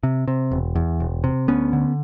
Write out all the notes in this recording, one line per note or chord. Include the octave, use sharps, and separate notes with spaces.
C3
C3
E1
E2
E1
C3
D2 B3 C#4
D3